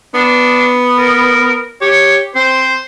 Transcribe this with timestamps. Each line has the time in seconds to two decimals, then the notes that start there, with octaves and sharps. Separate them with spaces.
0.14 B3 D4
0.98 A#4
1.81 G4 C#5
2.35 C4 C5